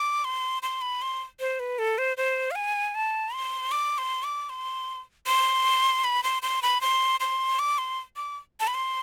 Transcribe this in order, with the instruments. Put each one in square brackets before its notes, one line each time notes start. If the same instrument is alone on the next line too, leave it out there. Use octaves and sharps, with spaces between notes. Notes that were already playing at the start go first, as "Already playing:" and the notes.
Already playing: [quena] D6
C6
C6
B5
C6
C5
B4
A4
C5
C5
F5
G#5
A5
C6
D6
C6
D6
C6
C6
B5
C6
C6
B5
C6
C6
D6
C6
D6
A5
B5
C6